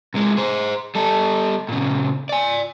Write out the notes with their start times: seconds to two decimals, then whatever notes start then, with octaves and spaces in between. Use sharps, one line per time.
0.14 C3 G#3
0.37 G#4 C5
0.95 G3 A4
1.69 A#2 C#3
2.29 D5 G#5